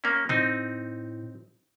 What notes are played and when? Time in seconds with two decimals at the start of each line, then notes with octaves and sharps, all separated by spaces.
0.04 A#3 C#4
0.29 A2 C4 D#4